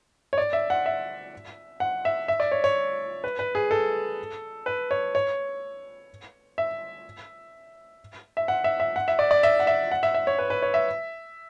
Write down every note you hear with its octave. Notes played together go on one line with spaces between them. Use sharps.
C#5
D5
E5
F#5
E5
F#5
E5
E5
D5
C#5
C#5
B4
B4
G#4
A4
B4
C#5
C#5
E5
E5
F#5
E5
E5
F#5
E5
D5
D5
E5
F#5
E5
F#5
E5
E5
C#5
B4
B4
C#5
E5